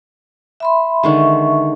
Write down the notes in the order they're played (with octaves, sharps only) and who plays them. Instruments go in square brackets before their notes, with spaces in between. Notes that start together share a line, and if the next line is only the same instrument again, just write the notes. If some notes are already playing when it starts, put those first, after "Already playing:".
[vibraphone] E5 B5 C6
[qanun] D3 D#3 G#3 [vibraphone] E5 C#6